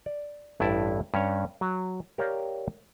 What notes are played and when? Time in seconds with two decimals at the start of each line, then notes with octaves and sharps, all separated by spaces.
0.06 D5
0.60 A1 G2 E4 D5 A5
1.14 G2 C#4 C#5
1.61 F#3
2.18 G4 A#4 C#5 D5 F5 G5